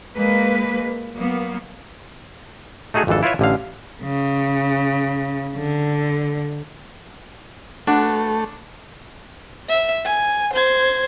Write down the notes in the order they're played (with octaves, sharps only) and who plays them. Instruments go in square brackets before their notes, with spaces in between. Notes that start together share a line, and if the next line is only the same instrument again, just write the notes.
[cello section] G#3 A#3 B4
F#3 A#3 B3
[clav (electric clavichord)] A3 D#4 F#4 G#4 A4
G#1 F2 E3 D4 A4
E4 F4 B4 C#5 E5
A1 D3 F5
[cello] C#3
D3
[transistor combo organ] A3 [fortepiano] D4 [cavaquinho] F#4 B4 D5
[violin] E5
G#5
C5 G#6